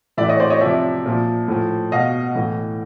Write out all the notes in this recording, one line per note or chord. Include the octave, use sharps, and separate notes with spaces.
A2 E3 D5 E5
C#5 D#5
C5 D5
C#5 D#5
C3 F3 D5 E5
A#2 F3
A2 F3
B2 D#5 F5
A2 E3